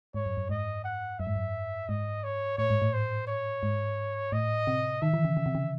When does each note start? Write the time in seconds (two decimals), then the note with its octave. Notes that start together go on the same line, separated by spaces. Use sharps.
0.14 G#2 C#5
0.26 F#2
0.37 F#2
0.49 G#2 D#5
0.84 F#5
1.19 F#2 E5
1.27 G#2
1.36 F#2
1.88 G#2 D#5
2.24 C#5
2.58 A2 C#5
2.70 G#2
2.82 A2
2.93 C5
3.27 C#5
3.63 G#2
4.32 A2 D#5
4.67 C3
5.02 D#3 E5
5.14 E3
5.25 C#3
5.37 C#3
5.46 C3
5.55 C#3